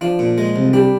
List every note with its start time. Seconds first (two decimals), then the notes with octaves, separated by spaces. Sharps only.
0.01 F3 D4 F4
0.19 A#2
0.38 G#3
0.56 C2
0.73 G3 D4 G4